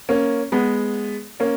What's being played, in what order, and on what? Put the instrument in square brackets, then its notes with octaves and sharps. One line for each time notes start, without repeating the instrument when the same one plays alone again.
[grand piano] A#3 C#4
G#3 B3
A#3 C#4